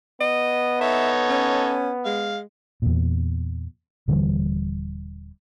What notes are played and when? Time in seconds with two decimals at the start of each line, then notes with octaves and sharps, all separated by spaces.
0.21 B3 D#5
0.81 D#4 A4 C#5 E5
1.29 C#4
2.05 G#3 F5
2.82 E2 A#2
4.08 D#1 D3 E3 G3